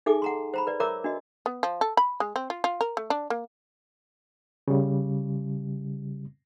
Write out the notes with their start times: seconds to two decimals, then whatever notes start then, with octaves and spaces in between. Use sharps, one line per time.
0.06 D#4 G#4 A4 E5 G#5 D6
0.22 F#5 A#5 C6
0.54 C5 A#5 B5
0.67 B4 D5
0.80 A#4 C#5 E5 A#5 D6 E6
1.04 D4 F#4 D#5
1.46 B3
1.63 F3
1.81 A4
1.97 B5
2.20 G#3
2.36 C4
2.50 F4
2.64 F4
2.81 A#4
2.97 A3
3.10 D4
3.30 A#3
4.68 C#3 G3